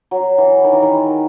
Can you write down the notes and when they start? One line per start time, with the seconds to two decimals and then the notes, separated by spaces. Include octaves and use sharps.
0.11 F#3
0.38 E3
0.64 D#3
0.73 E3
0.82 D#3